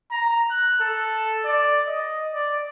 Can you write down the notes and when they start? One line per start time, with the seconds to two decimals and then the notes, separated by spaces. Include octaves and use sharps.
0.11 A#5
0.51 F#6
0.80 A4
1.45 D5
1.88 D#5
2.34 D5